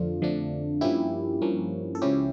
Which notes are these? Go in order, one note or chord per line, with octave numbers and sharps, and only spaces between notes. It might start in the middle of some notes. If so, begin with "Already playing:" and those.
Already playing: F2 D3 F3 A3 D4 F4
F2 D3 F3 A3 D4
G2 F3 A#3 C#4 E4 G4
G2 F3 A#3 C#4
A4
C#2 C#3 F3 C#4 E4 G4